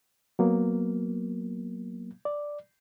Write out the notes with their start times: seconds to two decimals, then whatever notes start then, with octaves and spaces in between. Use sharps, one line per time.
0.39 F#3 A#3 B3
2.25 D5